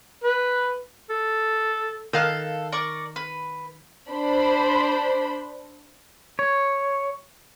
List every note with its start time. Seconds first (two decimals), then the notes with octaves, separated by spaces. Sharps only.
0.24 B4
1.10 A4
2.13 D#3 A4 F5 F#6
2.72 A#4 D5 C#6
3.16 B4
4.10 D4 C5 B5
6.39 C#5